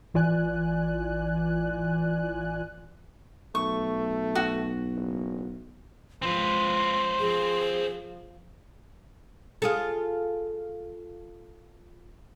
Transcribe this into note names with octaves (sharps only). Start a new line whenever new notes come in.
A1 E3 F4 D5 G#5 F#6
B1 A3 C#6
F#4
F#1
F3 G#3 C4 B4 C6
F3 G#4
F4 G#4 A4